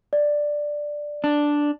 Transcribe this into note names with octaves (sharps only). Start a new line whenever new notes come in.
D5
D4